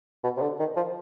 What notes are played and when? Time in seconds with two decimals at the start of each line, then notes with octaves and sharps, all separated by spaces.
0.23 B2
0.37 C3
0.41 D3
0.59 D#3
0.76 F3